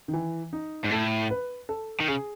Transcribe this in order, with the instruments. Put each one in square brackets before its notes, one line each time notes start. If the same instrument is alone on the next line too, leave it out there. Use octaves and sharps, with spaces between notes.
[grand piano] D#3
E3
D#4
[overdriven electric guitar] G#2
[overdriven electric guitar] A2 [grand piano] A4
[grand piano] B4
A4
[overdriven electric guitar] D#3
[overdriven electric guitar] C#3 [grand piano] G#4